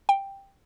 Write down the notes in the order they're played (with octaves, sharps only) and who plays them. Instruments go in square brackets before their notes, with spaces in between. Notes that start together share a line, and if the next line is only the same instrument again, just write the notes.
[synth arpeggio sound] G5